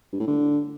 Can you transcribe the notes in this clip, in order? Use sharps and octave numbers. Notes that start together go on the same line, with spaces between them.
G2
A2
D3